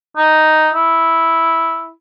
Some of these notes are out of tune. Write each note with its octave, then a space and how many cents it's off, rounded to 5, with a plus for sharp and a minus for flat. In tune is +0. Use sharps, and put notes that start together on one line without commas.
D#4 +0
E4 -5